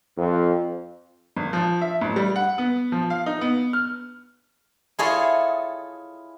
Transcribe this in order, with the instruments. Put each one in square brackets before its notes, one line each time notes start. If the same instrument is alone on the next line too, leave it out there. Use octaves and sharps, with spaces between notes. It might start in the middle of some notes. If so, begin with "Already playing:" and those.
[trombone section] F2
[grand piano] G#1
F3
E5
A1
G3
F#5
B3
F3
F5
D#4
B3
F6
[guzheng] E4 F4 G#4 A4 C#5 D#5